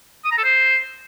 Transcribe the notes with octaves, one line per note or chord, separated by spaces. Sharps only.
D#6
A#5
A4
C5